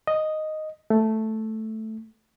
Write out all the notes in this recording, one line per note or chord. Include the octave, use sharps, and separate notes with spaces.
D#5
A3